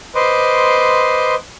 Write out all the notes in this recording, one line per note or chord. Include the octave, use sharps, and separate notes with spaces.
B4 C5 D#5 C6 D6